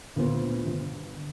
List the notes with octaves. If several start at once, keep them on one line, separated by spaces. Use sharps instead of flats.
D2 A#2 B3 F4 C5
G1